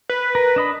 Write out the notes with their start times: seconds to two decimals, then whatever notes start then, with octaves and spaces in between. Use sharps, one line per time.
0.09 B4
0.35 A#4
0.56 D4 D#5 B5